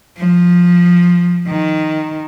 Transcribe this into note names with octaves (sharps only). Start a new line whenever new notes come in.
F3
D#3